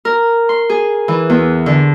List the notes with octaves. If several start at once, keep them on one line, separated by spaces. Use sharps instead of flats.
A#4
C6
G#4
E3
E2
D3